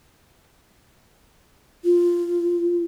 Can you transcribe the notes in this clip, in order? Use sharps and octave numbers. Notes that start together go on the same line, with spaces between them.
F4